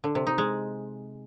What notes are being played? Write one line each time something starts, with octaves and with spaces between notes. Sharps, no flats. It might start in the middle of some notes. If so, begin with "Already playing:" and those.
D3
C3
D#4
G#3